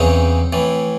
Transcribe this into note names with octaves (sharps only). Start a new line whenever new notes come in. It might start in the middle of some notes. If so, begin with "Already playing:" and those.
Already playing: E2 C#3 E3 C4 D#4
A2 E3